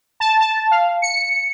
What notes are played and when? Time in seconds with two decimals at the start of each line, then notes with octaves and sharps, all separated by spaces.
0.20 A5
0.41 A5
0.71 F5
1.02 C#7